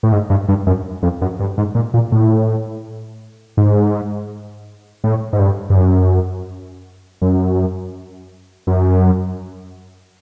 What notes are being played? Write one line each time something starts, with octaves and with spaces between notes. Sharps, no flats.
A2
G#2
G2
G2
F#2
F2
F#2
G2
G#2
A#2
A#2
A2
G#2
A2
G#2
G2
G2
F#2
F#2
F#2